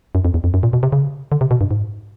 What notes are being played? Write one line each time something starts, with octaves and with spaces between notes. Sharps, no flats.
F#2
F2
E2
F2
F#2
A#2
B2
C3
C#3
D3
C3
B2
G2
G#2